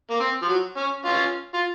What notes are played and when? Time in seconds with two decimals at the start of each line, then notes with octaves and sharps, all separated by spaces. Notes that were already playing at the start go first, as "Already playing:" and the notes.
0.10 A#3
0.20 C4
0.42 F3
0.48 F#3
0.77 C#4
1.05 C#4 F4
1.54 F4